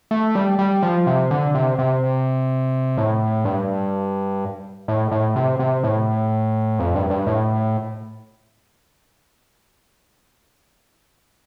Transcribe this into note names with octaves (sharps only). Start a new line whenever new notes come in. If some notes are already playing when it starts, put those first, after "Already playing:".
A3
G3
G3
F3
C3
D3
C3
C3
A2
G2
A2
A2
C3
C3
A2
F2
G2
G2
A2